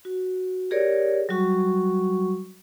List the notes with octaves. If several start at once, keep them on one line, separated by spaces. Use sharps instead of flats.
F#4
G4 G#4 A#4 C#5 D5
F#3 G3 F#4 C#6